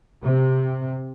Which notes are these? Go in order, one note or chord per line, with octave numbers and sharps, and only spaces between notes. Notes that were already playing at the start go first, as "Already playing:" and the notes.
C3